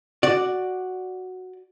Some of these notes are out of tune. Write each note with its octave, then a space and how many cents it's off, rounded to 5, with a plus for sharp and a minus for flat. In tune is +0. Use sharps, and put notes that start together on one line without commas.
F#4 +0 D5 +0